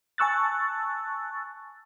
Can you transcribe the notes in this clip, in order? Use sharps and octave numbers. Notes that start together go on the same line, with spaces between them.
G#5 A5 C#6 E6 F#6 A6